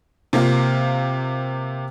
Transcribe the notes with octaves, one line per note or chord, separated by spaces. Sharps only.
C3 A#3 F4 F5